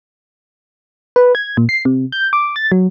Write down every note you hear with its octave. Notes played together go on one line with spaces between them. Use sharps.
B4
G#6
A#2
C7
C3
G6
D6
A6
F#3